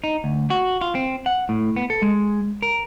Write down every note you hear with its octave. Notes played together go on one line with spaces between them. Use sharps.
D#4
D2
F#4
F4
C4
F#5
A2
B3
A4
G#3
A#4